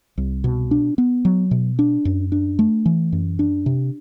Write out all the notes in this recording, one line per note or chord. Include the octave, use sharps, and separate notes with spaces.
C2
B2
D4
B3
F#3
B2
D4
F#2
D4
A3
E3
F#2
D4
C3